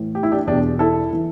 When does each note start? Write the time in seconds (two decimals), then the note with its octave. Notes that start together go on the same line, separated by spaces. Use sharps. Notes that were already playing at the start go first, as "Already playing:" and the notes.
Already playing: A2 E3
0.15 G4
0.23 E4
0.32 D4 G4
0.47 E2 B2 D4 G4
0.79 E4 A4
1.13 E3